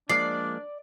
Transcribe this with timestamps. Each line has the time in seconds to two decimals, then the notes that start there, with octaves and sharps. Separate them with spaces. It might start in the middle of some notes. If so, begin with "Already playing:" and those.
0.10 F3 G#3 A#3 D4 D5 C7